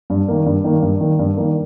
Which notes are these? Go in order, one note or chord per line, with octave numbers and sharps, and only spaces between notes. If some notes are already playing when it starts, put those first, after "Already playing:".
G2
D#3 A#3
G2
D#3 A#3
G2
D#3 A#3
G2
D#3 A#3